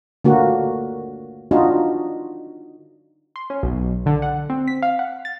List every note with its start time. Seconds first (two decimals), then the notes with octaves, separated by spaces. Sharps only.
0.25 D3 A#3 F#4
1.51 D4 D#4 F4 F#4
3.36 C6
3.50 C#4
3.63 B1
4.06 D3
4.22 F#5
4.50 C4
4.68 B6
4.82 F5
4.99 F#5
5.25 A6